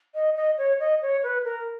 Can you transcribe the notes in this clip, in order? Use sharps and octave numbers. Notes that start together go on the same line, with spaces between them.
D#5
D#5
C#5
D#5
C#5
B4
A#4